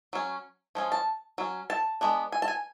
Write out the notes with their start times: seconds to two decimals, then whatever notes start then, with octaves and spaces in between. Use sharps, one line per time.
0.13 F#3 C#4
0.75 F3 G#3 C#4
0.92 A5
1.38 F#3 C#4
1.70 A5
2.01 G#3 B3 D4
2.32 G#5
2.42 A5
2.48 G#5